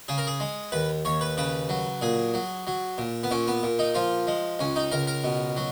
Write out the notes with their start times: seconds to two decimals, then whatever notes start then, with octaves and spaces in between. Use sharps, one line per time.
0.08 C#3 G#4
0.18 A#4
0.27 G#4
0.40 G#3
0.72 D#2 B4
1.05 D#2 C#5
1.21 B4
1.37 C#3 B4
1.69 F#3
2.01 A#2 G#4
2.34 F#3
2.67 F#3
2.98 A#2
3.23 B3
3.31 A#2 C#4
3.47 B3
3.63 A#2
3.79 D#4
3.95 F3 F4
4.27 G#3
4.59 C#2 C#4
4.76 D#4
4.92 C#2 A#4
5.07 A#4
5.24 B2
5.57 F#3